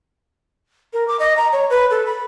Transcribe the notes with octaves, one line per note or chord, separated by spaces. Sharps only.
A#4
D6
D#5
A#5
C#5
B4
A4
B5